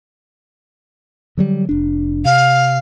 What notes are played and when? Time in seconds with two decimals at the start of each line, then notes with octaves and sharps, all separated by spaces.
1.37 D3 F#3 G3
1.69 F1 D4
2.25 C3 F5